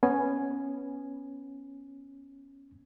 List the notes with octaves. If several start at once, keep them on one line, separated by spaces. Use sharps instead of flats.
B3 C#4 G#5